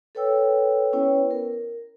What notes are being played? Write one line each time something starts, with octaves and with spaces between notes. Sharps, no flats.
A4 B4 C#5 G5 E6
B3 C#4 E4 B4 C#5 G5
A#4